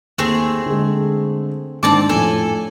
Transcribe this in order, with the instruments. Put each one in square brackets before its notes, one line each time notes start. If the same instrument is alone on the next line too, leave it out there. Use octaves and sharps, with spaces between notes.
[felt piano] D#2 [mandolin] A3 C4 G#4
[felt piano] D3 G#3
[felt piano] G#2 D#3 D4 [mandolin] C4 A5 D6
[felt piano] F2 A2 [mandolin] A4 G#5